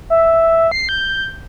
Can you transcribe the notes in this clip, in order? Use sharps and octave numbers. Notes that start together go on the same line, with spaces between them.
E5
C7
G6